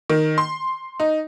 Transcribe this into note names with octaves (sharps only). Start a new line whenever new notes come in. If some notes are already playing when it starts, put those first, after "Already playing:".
D#3
C6
D#4